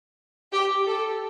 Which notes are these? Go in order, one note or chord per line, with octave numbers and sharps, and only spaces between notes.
G4
A4